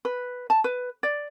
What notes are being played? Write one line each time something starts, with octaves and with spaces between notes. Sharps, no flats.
B4
A5
B4
D5